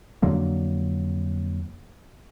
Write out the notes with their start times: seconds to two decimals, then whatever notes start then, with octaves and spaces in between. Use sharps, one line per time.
0.22 F2 D3 F#3 A#3